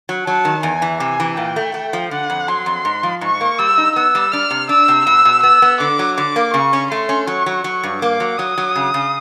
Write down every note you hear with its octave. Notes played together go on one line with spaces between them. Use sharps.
F#3
F#3 A5
D#3
E2 G#5
E3
C3 G#5
E3
A#2 G5
A3
A3
F3
D3 F#5
F2
F#3 C6
F2
G#2
F3
G#2 C#6
A#3
G3 E6
D#4
B3 E6
G3
D4 F6
C3
D4 E6
C3
B2 E6
B2
B3 E6
B3
D3 D6
F#3
D3 D6
A#3
C#3 C#6
C#4
A3 C6
C#4
F#3 C#6
F#3
F#3 C#6
G2
A#3 D6
F#3
F#3 D#6
F#3
C#3
C#3